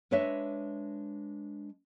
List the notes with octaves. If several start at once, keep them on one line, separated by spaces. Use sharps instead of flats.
G#3 D4 B4 C#5 D#5 E5